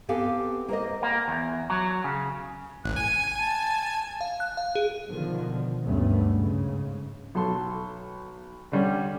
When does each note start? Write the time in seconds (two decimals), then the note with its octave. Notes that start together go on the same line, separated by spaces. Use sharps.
0.09 B3 C4 G4 A4 F5 G#5
0.68 A#3 A#4 C5 D#5
1.02 A#3
1.28 E2
1.70 F#3
2.04 C#3
2.84 A1 F#6
2.96 G#5 D#7
3.38 A5
4.21 F5
4.40 F#6
4.57 F5
4.75 G#4
5.08 B2 D3 D#3 F3
5.84 F#1 D2 G2 A3 B3 C#4
6.36 G#2 C#3
7.35 B1 A4 C6
8.72 D3 G3 C#4